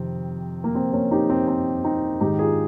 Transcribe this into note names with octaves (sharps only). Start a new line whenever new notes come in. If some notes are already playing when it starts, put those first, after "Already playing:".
Already playing: F2 C3 D#3 C4
A#3
C4
A#3 C#4
D#4 G4
C4
C4
C4 D#4
G#2 D#3 D#4 G4
F4 G#4